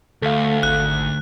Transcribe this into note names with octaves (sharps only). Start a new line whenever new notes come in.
D2 A3 A4 F5
G#1 F#6